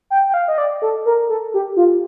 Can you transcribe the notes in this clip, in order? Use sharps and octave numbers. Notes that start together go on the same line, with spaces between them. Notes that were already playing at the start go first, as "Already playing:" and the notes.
G5
G5
F5
D#5
D5
A4
A#4
A4
G4
F4